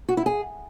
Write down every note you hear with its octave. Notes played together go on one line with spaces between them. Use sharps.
F#4
E4
G#4